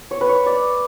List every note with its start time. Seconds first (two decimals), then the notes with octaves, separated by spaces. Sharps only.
0.11 C#5
0.21 B4
0.29 C#5
0.46 D5